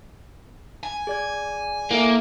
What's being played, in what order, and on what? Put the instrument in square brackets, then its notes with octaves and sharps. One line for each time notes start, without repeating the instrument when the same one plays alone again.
[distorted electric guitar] G#5
[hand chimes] G#4 D5 G#6
[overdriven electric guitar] A#3 [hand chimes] E4 A4 E5